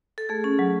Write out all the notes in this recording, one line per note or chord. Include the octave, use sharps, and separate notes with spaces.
A4
A3 G#4
C#4
F#3